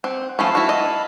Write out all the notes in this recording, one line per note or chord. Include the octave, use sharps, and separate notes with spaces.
C4 F#5
F3 A3 C#4 F5 A5 B5
E4 F#4
D#5